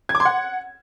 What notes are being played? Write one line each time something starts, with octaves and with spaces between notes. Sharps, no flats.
G#6
D6
C6
F#5